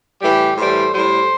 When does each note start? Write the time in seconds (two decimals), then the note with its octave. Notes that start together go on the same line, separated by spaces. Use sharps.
0.21 A2 E3 G3 G4
0.56 A2 E3 G3 C5
0.93 A2 G3 C5